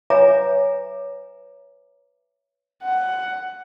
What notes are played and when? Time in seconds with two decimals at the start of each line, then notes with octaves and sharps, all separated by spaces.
0.10 B4 C#5 E5 G#5 A#5 D6
2.83 F#5